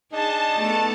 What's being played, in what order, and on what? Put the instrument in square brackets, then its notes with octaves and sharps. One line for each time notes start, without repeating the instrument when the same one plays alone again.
[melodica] D4 [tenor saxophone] D#4 [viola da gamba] G#4 [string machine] A5
[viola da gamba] A3 B3 A4